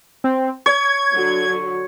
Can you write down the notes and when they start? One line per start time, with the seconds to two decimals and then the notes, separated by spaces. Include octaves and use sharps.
0.24 C4
0.66 C#5 G#6
1.13 D3 F#3